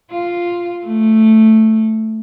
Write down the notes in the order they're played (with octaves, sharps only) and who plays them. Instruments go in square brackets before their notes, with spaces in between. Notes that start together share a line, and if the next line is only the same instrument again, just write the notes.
[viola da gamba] F4
A3